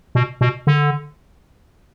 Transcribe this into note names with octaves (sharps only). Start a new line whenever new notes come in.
B2
B2
D3